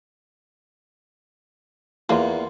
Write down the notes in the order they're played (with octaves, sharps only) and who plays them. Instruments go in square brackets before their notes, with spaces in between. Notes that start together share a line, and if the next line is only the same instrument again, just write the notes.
[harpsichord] E2 [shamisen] A#3 F4